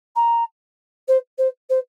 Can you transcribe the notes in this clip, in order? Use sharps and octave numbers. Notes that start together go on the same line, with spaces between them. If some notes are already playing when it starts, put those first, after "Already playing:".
A#5
C5
C5
C5